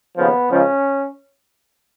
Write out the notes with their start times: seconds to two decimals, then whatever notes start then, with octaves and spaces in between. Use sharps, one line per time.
0.17 D#2 C#3 F3 B3
0.50 C#2 C#3 F3 C#4